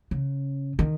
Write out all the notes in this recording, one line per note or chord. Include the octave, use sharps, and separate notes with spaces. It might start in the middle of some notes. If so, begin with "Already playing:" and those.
C#3
D#3